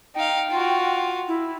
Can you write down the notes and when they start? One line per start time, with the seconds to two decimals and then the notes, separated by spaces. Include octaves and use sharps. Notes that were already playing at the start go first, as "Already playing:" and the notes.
0.15 D#4 F5 G5
0.50 F4 F#4
1.28 E4